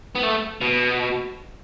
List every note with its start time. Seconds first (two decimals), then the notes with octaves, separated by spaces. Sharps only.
0.15 B3
0.23 A3
0.61 B2